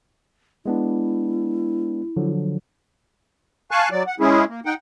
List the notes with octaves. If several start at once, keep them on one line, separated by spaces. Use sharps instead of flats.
G#3 B3 D4 E4
D3 F3 F#3
F5 G#5 A5 C#6 F#6
F#3 D5
F#5
G#3 C#4 E4 G#4
A#3
D#4 F#5 G5